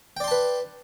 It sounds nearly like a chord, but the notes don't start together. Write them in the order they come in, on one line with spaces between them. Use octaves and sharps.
G5 D5 C6 A5 B4